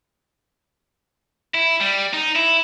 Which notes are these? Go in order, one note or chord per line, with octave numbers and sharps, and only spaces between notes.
E4
G3
D#4
E4